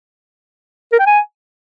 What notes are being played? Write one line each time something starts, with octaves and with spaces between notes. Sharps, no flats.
A#4
G5
G#5